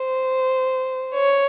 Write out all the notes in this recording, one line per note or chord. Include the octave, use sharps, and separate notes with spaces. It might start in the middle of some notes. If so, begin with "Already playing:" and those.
Already playing: C5
C#5